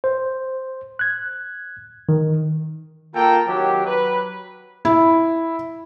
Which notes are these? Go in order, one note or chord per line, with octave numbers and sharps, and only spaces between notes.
C5
F#6 G#6
D#3
A#3 F4 A4 G5 A#5
D#3 F#3 C4 G4
F#3 B4
E4